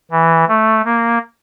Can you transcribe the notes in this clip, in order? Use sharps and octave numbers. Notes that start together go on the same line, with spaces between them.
E3
A3
A#3